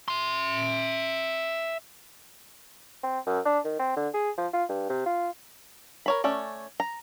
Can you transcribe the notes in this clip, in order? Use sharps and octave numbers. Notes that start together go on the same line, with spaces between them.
E5 C6
C4
F#2
D4
D#3
C4
D3
G#4
F3
F4
G2
C3
F4
A#4 C#5 B5
A3 C#4 D5
A#5